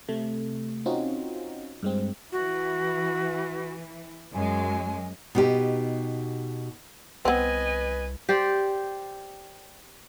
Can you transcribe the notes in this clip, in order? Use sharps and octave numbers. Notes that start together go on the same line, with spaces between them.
C3 A3
C4 C#4 D#4 F4 F#4
G2 G#3 C4
E3 F#4
F#2 G#3 G#5
B2 D#4 G4
C2 B3 C4 B4 D#5 G#5
G4 C5 D5